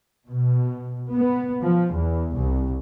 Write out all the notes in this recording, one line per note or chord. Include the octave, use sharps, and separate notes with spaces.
B2
B3
F3
E2
C2